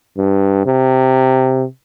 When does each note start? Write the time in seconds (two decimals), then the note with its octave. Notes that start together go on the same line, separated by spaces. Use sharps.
0.18 G2
0.66 C3